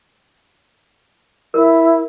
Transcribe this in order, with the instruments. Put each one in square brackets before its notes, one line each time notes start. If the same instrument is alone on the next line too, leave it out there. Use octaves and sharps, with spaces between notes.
[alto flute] E4 [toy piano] A#4